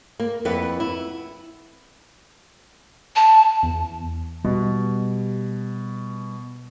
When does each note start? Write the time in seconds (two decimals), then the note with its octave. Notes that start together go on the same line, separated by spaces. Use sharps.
0.20 A#3
0.45 F2 E4 B4 F#5
0.80 E4
3.16 A5
3.63 E2
4.45 B2 G3